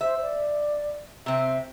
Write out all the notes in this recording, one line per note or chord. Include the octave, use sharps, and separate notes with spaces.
C5 E5
D5
C3 C4 E5